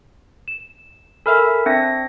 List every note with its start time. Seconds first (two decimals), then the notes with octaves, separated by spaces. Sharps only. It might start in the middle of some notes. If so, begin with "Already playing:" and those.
0.48 E7
1.26 A4 A#4 E5 G#5 B5 F6
1.66 C4 D4 E5 A#6